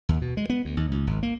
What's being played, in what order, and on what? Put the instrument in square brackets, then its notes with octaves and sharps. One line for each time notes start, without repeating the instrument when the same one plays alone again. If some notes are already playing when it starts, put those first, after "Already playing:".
[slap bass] D#2
B2
G#3
B3
D2
D#2
C#2
G#1
A#3